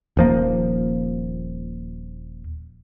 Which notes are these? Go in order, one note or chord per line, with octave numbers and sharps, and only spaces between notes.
D#1 F3 A#3